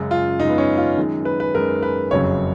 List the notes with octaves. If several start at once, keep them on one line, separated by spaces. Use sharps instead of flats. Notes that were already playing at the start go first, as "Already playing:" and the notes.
Already playing: F#2 C#3 G#3
F4
F#2 C#3 G#3 D#4
B3
C#4
F4
F#2 D#3 G#3
B4
B4
F#2 D#3 G#3 A#4
B4
F#1 F2 C#3 F#3 C#5